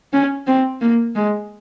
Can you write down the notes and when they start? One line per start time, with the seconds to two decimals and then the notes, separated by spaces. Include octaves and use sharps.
0.13 C#4
0.47 C4
0.81 A#3
1.15 G#3